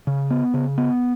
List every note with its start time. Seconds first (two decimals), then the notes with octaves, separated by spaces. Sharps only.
0.07 C#3
0.30 B3
0.54 C#3
0.78 B3